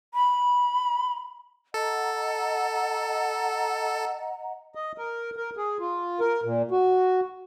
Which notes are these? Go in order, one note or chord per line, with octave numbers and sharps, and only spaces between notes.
B5
A4 D#5 F#5 A#5
D#5
A#4
A#4
G#4
F4
A#4
A#2
F#4